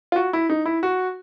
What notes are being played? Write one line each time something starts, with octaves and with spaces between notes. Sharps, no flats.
F4
F#4
E4
D#4
E4
F#4